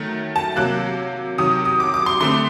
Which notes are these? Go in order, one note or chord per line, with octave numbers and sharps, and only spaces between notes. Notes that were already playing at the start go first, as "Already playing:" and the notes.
Already playing: D#3 F#3 A3
A5
C3 F#3 A#3 F#6
C3 D#3 F#3 D#6
D#6
D6
D6
C6
D3 A3 C4 C6